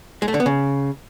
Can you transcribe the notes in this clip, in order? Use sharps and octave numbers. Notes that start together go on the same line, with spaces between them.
G#3
A3
D3
B3
C#3